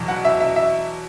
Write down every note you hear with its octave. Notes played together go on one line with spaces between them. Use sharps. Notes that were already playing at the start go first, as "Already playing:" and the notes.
Already playing: E2 B2 F#3
F#5
E5
E5
E5